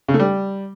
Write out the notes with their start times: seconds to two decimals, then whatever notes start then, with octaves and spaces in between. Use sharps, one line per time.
0.08 C#3
0.14 A3
0.20 G3